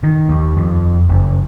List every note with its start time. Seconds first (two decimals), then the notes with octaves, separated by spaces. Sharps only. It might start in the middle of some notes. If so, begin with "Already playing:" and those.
0.03 D#3
0.29 D#2
0.57 F2
1.09 F#1